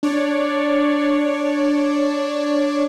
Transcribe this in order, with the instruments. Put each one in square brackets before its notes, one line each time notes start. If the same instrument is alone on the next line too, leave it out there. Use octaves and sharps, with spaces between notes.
[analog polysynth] D4 C#5 D5